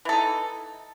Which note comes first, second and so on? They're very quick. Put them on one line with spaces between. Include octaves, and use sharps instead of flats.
E3 A4 D#4